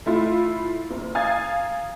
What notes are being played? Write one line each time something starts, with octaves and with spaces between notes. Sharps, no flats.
A3 E4 F4
F#1
F5 G#5 A#5 D#6 G#6 A6